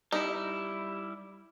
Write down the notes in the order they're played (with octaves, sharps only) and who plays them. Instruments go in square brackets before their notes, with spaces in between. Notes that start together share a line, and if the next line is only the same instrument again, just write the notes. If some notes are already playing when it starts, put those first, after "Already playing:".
[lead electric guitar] G3 E4 [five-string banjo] D#4